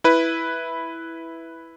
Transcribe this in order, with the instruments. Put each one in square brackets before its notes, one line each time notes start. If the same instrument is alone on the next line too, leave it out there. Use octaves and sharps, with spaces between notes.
[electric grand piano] E4 B4